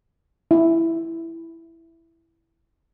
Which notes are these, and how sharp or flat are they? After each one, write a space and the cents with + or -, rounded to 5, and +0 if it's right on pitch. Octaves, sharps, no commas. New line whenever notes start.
E4 +0